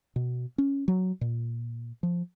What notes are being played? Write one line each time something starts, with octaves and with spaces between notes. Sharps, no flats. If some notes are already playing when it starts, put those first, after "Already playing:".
B2
C#4
F#3
A#2
F3